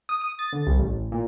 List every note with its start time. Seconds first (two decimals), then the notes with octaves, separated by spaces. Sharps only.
0.09 D#6
0.21 D#6
0.39 A6
0.53 D3
0.67 C2
0.79 A1
1.12 A#2